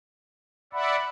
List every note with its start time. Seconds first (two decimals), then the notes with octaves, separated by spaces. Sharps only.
0.73 D5 E5 F#5 B5